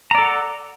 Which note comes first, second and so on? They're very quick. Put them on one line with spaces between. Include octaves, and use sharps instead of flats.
A#5 D5 A4 F#5